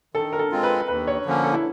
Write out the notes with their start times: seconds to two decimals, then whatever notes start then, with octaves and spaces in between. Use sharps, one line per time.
0.14 D#3 A4
0.33 A#4
0.39 A4
0.51 G#3 C4 F4
0.63 B4
0.88 D#2 B4
1.07 C#5
1.25 D3 F3 A#3 C#4
1.44 A4
1.53 E4